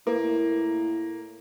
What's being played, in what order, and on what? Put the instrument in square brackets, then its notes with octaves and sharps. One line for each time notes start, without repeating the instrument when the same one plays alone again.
[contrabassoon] A2 [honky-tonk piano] A#3